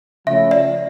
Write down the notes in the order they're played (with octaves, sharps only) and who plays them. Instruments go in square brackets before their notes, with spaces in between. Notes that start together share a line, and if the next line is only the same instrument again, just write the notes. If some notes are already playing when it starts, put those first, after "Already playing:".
[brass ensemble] C#3 F3 A3 C#4 E4 [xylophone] E5
[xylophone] D5